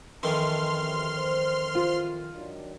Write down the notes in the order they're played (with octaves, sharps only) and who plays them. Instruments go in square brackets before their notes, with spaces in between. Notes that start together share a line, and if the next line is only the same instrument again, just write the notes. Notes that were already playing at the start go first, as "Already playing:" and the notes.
[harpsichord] F2 D#3 E3 [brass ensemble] D#5 A5 [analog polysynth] C6 F6
[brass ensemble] F#2 C3
C5
[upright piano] F4
[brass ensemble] D#3 F#3 D4